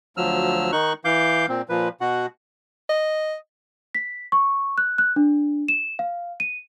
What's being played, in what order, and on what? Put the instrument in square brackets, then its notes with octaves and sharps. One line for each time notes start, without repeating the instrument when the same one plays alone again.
[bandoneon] D2 F3 F#3 E6 F6
D#3 D#4 C#6 F#6
E3 F5 D6 G6
A#2 C4
A#2 F3 B4
B2 F#4 F#5
[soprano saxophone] D#5
[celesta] B6
C#6
F#6
F#6
D4
E7
F5
D#7